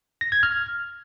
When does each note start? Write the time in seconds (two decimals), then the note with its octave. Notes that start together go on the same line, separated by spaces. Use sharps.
0.21 A#6
0.32 G#6
0.43 F6